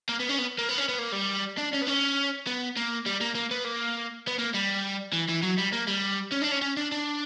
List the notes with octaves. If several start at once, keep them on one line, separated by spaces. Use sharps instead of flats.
A#3
B3
C#4
B3
A#3
B3
C#4
B3
A#3
G3
D4
C#4
B3
C#4
B3
A#3
G3
A#3
A#3
B3
A#3
B3
A#3
G3
E3
E3
F#3
G3
A#3
G3
C#4
D4
C#4
C#4
D4
D4